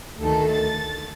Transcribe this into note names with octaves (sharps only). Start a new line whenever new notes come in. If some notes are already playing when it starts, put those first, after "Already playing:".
D2 D#3 A3 A4
A6